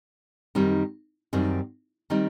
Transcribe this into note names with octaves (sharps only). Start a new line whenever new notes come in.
F#2 D#3 G3 C4 D#4
F#2 D#3 G3 C4 D#4
D#3 G3 C4 D#4